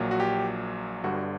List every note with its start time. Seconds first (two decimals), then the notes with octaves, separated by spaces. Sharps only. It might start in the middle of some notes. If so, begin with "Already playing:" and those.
Already playing: A#1 A#2 F#3
0.11 F#4
0.20 G4
1.04 G1 G2 D3 G3 F#4